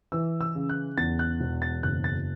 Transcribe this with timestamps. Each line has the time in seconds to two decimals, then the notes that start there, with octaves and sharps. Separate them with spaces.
0.12 E3 E6
0.41 E6
0.55 C#3
0.69 F#6
0.97 E2 A6
1.19 F#6
1.40 E1
1.62 A6
1.83 F#1 F#6
2.04 A6